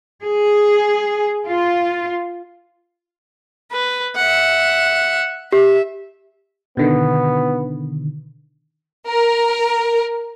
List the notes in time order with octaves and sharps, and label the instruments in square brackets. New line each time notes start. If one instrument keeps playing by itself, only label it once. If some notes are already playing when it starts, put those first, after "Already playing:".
[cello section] G#4
F4
[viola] B4
E5 F#5
[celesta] G4 [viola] E5
[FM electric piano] B2 D3 D#3 [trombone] B3
[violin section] A#4